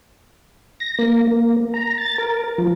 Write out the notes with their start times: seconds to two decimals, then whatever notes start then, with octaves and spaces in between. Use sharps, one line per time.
0.80 A#6
0.99 A#3
1.27 A#3
1.74 A#5
1.98 A6
2.18 A#4
2.58 F3